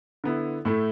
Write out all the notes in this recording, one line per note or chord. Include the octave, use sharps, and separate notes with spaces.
D3 B3 E4
A2 A3 E4